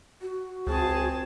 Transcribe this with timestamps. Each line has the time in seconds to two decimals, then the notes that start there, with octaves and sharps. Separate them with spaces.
0.22 F#4
0.67 C#2 C4 G#4 A5